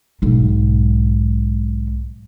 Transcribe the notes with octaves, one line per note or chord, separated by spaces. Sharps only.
B1 G#2